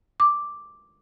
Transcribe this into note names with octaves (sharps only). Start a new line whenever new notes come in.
D6